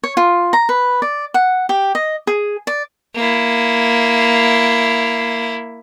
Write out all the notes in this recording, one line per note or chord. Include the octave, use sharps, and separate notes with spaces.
C#5
F4
A#5
B4
D5
F#5
G4
D#5
G#4
D5
A#3 E4